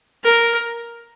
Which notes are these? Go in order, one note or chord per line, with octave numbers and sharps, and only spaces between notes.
A#4